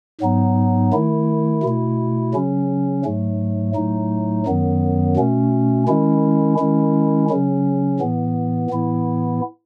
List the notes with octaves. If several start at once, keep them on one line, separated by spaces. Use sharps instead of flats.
G#2 F#3 B3 D#4
D#3 A3 E4
B2 A3 E4
C#3 F#3 C#4
G#2 F#3 A3
A2 F#3 A3 D#4
F#2 D#3 F#3 B3
B2 A3 C#4
D#3 G#3 C#4 E4
D#3 G#3 C#4 E4
C#3 F#3 C#4
A2 E3 B3
A2 E3 B3 E4